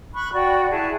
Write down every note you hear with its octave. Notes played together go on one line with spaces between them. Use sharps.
B5 C#6 F#6
F#4 D5 G5
E4 G#4 A5